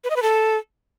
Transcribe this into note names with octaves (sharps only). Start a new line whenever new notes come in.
B4
D#5
B4
A4